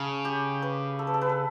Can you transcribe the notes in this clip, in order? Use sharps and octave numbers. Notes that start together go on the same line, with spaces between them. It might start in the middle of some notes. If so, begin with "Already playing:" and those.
Already playing: C#3 A4
G4
B4
A4
B4
A4
B4
A4